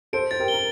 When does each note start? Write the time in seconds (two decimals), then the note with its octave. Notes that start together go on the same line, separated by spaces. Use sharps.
0.13 A4 C5 D7
0.31 C5 A6
0.40 G4 A#4
0.48 G7
0.54 A#4